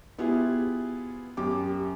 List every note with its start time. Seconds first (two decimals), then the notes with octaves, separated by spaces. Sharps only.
0.18 B3 E4 F4 G4 G#4
1.37 F#2 G4 D6